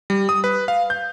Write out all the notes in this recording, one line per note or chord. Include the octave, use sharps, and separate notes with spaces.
G3
D#6
B4
F5
G6